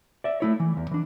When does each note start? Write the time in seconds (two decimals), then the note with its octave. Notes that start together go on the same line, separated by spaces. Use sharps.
0.24 D5 E5
0.40 A3 E4 C#5
0.60 E3
0.77 E2
0.91 E3 D4